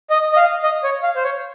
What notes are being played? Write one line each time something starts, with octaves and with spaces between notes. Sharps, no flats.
D#5
D#5
F5
D#5
C#5
F5
C5
C#5